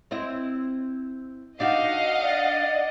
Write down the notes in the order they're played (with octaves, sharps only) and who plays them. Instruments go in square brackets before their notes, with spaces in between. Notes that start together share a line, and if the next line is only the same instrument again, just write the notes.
[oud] C4 E4 D#5
[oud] D4 D#4 F#4 [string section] D#5 F#5 [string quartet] F5
[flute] D5